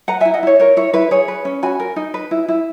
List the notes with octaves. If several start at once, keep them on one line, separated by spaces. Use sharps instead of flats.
B4 F#5 A#5
E4 E5 G#5
D#5 F#5
E4 C#5
A#4 C#5
E4 C#5
E4 B4
G#4 C#5
B4
C#4
F#4 G#5 B5
A#4
D#4
B4
E4
E4